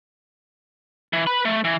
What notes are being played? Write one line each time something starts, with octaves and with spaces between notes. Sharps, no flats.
E3
B4 B5
A3
E3